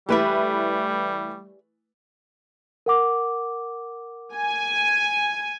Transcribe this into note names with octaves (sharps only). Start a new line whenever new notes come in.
E3 G3 A3 G4 B4 D5 E5
A#4 F#5 D6
G#5